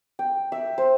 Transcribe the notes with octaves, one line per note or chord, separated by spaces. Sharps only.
G5
E5
C5